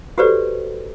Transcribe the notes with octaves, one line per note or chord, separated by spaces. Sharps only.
F#4 G4 A4 B4 C5 D5